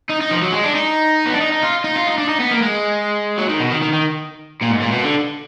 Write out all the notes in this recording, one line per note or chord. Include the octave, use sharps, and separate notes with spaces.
D#4
D#4
F3
F#3
G#3
D4
D#4
B3
D4
D#4
D#4
F4
D#4
F4
D#4
D4
D#4
B3
A#3
G#3
F#3
D#3
B2
D#3
D#3
D#3
A#2
G#2
A#2
B2
D3